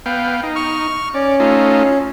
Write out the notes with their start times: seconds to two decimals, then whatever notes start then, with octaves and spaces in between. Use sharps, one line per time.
0.06 B3 F5 G5
0.43 D#4
0.56 C#6 F6
1.14 C#4 D5
1.40 A3 D#4 F4